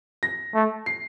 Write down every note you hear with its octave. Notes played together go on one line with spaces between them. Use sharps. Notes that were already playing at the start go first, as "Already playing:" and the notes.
A#6
A3
C7